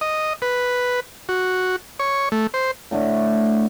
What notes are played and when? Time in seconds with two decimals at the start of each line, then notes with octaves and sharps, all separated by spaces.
0.01 D#5
0.42 B4
1.29 F#4
2.00 C#5
2.32 A3
2.54 C5
2.91 A2 D3 A3